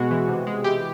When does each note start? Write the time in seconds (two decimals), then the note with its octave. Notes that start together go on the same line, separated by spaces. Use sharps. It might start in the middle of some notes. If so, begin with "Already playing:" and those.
Already playing: B2 G#3 F#4
0.11 E3
0.28 C3
0.47 G#3
0.64 E3 G4